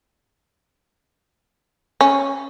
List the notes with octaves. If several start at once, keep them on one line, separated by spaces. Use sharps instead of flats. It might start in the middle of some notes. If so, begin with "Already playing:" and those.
C#4